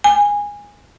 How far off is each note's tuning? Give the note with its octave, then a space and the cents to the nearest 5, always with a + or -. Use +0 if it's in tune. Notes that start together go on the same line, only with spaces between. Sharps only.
G#5 -15